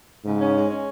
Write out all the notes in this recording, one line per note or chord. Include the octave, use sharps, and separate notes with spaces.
G#2 C#3
C#4
G#3
C#4